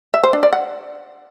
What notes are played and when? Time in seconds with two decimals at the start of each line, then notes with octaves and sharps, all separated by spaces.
0.14 E5
0.23 C5
0.33 D4
0.43 D5
0.53 F#5